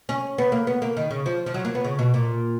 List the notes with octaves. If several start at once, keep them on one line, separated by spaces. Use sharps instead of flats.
C#4
B3
A#3
B3
A#3
D#3
C#3
F3
F3
F#3
A#3
B3
C#3
B2
A#2